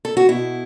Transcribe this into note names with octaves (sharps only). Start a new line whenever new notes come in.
A4
F#4
B2 E4